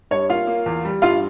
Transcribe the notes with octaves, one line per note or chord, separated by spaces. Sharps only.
G2 C#5
A#3 F4 F5
A#3
E2
G3
G2 F4 F5